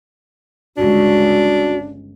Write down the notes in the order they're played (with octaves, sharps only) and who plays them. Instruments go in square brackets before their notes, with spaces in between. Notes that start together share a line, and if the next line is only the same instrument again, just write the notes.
[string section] G1 C#2 [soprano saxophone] D4 [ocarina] F#4